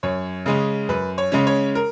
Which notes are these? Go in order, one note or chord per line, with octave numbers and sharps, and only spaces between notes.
F#2 C#5
C#3 G#3 C#4
F#2 B4
C#5
C#3 G#3 C#4
C#5
A#4